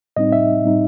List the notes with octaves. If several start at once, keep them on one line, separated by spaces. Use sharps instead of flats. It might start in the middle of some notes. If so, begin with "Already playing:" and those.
A2 G3 C4 D#4 D#5
E5
A2 G3 C4 D#4